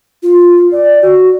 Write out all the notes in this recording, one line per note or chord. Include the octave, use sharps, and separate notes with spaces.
F4
D5
F#4